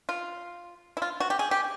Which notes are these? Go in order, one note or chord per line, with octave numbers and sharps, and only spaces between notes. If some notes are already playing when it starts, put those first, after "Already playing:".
F4
E4
F4
F#4
G4
G#4
G4